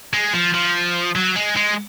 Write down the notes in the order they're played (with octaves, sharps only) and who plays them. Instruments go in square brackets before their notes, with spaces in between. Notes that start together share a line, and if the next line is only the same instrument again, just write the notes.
[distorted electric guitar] G#3
F3
F3
F#3
G#3
G#3